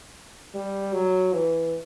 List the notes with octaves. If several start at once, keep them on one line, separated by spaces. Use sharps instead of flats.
G3
F#3
E3